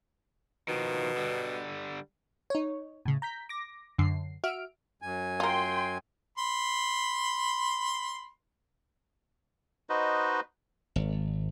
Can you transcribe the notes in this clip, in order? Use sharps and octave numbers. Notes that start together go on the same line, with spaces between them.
B2 D#3 F3
D3 G3
D#4 C#5
A2 C#3
A#5 G6 B6
D6 A#6
F#2 D3 C7
F#4 E5 F6 D7
F#2 G#5
F4 A#4 G5 C6
B5 C6
D#4 F#4 B4 C5 D#5
G#1